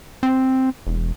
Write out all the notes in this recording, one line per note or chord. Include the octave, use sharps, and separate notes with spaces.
C4
E1